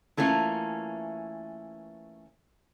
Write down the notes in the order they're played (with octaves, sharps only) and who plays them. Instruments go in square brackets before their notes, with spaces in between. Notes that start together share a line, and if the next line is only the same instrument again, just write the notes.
[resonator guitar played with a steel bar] E3 A3 A#3 C#4 F4